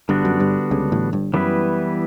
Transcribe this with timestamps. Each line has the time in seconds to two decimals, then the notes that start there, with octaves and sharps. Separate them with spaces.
0.09 G1 G2 D3 G3 B3 D4 F#4
0.25 F#2
0.40 G1 G2
0.71 C#2 C#3
0.92 A1 A2
1.13 G1 G2
1.33 F#2 E3 G3 B3 E4 B4